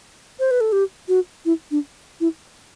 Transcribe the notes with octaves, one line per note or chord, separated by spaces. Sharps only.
C5
B4
A4
G4
F#4
E4
D4
E4